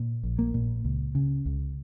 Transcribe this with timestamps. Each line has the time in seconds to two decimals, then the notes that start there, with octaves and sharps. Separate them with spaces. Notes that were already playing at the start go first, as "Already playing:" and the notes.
Already playing: A#2
0.23 A#1
0.39 A#3
0.54 A#2
0.85 C#2
1.15 C#3
1.46 C#2